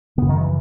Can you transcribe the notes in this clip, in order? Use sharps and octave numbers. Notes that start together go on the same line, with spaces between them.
F#2 C#3 B3
D#3
E3